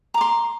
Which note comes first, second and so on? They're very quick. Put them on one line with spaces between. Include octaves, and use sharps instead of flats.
A#5 D6 C6